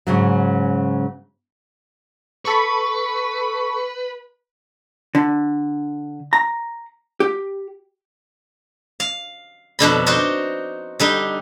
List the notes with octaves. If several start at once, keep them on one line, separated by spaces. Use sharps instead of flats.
G#2 C#3 F#3
A4 B4 B5 C#6
D3
A#5
G4
F5
F2 B2 D3 B5
D#4 F#4 C5 D5
D3 G3 D#4